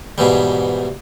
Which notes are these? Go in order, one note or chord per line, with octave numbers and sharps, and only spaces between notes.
G#2 B2 E3 G3